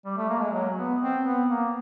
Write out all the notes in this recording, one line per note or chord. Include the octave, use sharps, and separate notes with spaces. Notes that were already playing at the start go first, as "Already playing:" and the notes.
G3
A3
A#3
G#3
F#3
B3
C4
B3
A#3